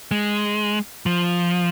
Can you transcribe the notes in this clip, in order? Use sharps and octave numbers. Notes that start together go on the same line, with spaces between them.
G#3
F3